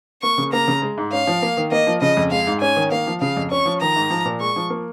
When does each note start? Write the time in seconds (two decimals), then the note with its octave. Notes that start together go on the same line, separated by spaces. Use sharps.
0.22 A#3 C#6
0.38 C#3
0.53 A#3 A#5
0.68 C#3
0.82 G#3
0.98 G#2
1.12 C#4 F5
1.27 F3
1.42 A#3
1.57 D#3
1.71 A#3 D#5
1.87 F3
2.01 C#3 D#5
2.17 F2
2.31 G#3 F5
2.47 G#2
2.61 C#4 G#5
2.76 D#3
2.92 A#3 F5
3.07 F3
3.21 C#3 F5
3.37 F2
3.51 C#4 C#6
3.66 F3
3.81 D#3 A#5
3.96 G#2
4.10 F3
4.25 A#2
4.40 G#3 C#6
4.56 F3
4.70 A#3